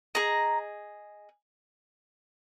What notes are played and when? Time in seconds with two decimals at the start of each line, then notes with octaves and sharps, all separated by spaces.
0.15 G#4 D#5 A#5